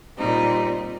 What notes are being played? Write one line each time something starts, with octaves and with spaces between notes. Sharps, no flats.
A#2 G3 C4 D#4